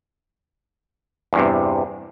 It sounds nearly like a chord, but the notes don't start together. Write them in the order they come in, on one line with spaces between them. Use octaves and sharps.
E2 G2 C3